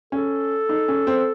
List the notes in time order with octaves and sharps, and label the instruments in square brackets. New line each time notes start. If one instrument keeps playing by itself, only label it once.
[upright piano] C#4 [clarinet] A4
[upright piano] D#4
C#4
C4